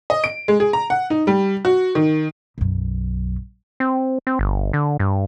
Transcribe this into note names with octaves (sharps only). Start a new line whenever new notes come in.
D#5
D7
G#3
G#4
A#5
F#5
D#4
G3
F#4
D#3
B1 F#2
C4
C4
G1
D3
G2